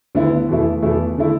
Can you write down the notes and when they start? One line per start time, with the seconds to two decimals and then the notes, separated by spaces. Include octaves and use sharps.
0.15 D2 D3 B3 E4
0.49 E2 B2 A3 E4
0.82 E2 B2 A3 E4
1.18 D3 A3 E4